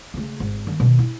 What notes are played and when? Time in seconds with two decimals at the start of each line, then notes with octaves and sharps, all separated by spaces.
0.14 C#3 A3
0.40 G#1
0.67 D#3 A#3
0.80 B2 D#3
0.99 E4